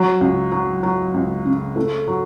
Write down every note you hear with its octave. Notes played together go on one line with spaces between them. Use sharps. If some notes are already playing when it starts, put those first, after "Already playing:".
Already playing: F#3
C#2
F#3
F#3
C#2
C#3
A3
F#3